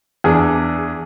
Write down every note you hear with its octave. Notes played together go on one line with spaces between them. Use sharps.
E2 D4 G#4